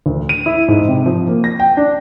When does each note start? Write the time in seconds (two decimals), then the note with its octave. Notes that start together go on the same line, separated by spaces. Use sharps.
0.06 D2
0.29 D#7
0.46 E4
0.68 G#2
0.88 C3
1.06 F3
1.28 A#3
1.44 A#6
1.60 G5
1.77 D4